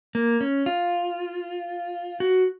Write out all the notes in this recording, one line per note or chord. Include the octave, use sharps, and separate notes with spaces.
A#3
C#4
F4
F#4